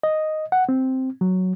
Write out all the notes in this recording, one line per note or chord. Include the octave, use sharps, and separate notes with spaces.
D#5
F#5
C4
F#3